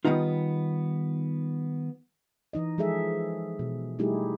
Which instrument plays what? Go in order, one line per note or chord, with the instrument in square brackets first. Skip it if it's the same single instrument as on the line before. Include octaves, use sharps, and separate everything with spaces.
[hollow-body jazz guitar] D#3 E3 G3 B3 D#4 F4
[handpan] E3 D#4 D#5
F3 G#3 G#4 A4 E5
B2
G3 A3 D#4 E4 G4 G#4